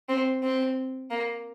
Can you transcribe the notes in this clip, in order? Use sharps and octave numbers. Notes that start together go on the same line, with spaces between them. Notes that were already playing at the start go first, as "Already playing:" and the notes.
C4
C4
A#3